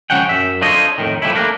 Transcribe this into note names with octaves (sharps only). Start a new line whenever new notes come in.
C#2 C#3 F3 C#4 F#5 G5
F#2 C#3 E5
D4 F4 A4 C5 C#5 D#5
F2 A2 D#3
F3 G3 A3 E4
A3 A#3 D4 A#4